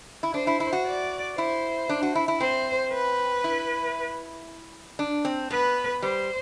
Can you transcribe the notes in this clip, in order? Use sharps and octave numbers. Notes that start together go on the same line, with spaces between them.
E4
D4 C5
E4
E4
F#4
D5
E4 C5
D4
F#4
E4
E4
C4 C5
B4
E4
D4
C4
B3 B4
G3 C5